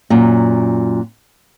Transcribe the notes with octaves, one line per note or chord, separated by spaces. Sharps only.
F#2 A#2